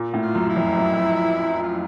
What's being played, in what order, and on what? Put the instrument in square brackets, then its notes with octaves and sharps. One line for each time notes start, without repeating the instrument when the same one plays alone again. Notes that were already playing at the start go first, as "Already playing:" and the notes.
Already playing: [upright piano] A#2
A2
[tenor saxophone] F4
[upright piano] F#2
[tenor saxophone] E4
[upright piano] F2
F#2
[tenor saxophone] F4